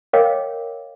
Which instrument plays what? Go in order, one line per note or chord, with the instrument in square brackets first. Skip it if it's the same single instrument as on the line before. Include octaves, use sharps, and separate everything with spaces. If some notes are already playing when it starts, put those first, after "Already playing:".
[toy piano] A#4 C#5 D#5 F5 G5 D6